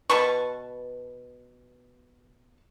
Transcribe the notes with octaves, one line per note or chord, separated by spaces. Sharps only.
B2 B4 A5 C#6